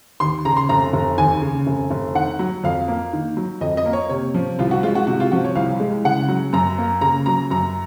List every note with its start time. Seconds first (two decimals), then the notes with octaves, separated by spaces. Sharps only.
0.20 D#2 C6
0.45 C#3 A#5
0.57 C6
0.69 F1 A#5
0.93 F1
1.18 D#2 G#5
1.42 C#3
1.67 F1
1.90 F1
2.15 D#3 F#5
2.39 F#3
2.64 F2 F5
2.88 A#3
3.13 D#3
3.37 F#3
3.61 F2 D#5
3.77 D#5
3.86 A#3
3.93 C#5
4.09 C3 C#5
4.34 F3
4.59 C2 F4
4.71 F#4
4.83 G#3 F4
4.95 F#4
5.07 C3 F#4
5.20 F4
5.32 F3 F#4
5.44 C#5
5.55 C2 F5
5.80 G#3
6.04 C#3 F#5
6.28 F#3
6.53 F#2 A#5
6.78 A#3
7.01 C#3 A#5
7.26 F#3 A#5
7.51 F#2 A#5